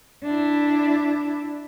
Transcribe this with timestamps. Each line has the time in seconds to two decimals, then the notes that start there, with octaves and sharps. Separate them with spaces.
0.24 D4 E4